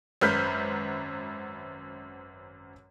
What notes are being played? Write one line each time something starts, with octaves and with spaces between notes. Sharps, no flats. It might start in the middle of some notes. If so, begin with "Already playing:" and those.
G#1 F#2 B4 F6 G6 B6